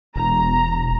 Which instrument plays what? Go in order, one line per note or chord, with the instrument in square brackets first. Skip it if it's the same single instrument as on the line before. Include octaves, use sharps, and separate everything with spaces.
[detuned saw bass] E1 [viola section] A#5